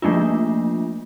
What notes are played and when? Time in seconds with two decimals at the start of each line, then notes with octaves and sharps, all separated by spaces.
0.02 F3 A3 A#3 D4 F4